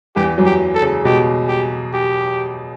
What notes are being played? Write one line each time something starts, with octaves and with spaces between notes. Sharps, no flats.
E2 E3 G4
F#2 F#3
G4
A4
C#3
B2 G4
G4
G4